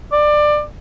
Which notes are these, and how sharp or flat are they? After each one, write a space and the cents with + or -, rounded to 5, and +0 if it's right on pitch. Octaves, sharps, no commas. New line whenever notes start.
D5 +20